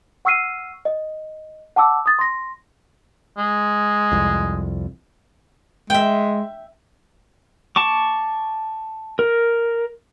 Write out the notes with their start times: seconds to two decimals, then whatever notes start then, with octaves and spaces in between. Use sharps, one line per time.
0.25 F#5 C#6 E6 F6 C7 D#7
0.85 D#5
1.76 F#5 A5 D6 E6
2.06 D#6 A6
2.19 C6 A#6
3.38 G#3
4.12 C2 F2
5.90 G#3 E5 G5
7.76 A5 C#6 D6
9.19 A#4